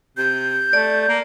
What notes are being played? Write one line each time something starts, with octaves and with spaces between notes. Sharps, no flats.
C3 G6
A3 D5
A#3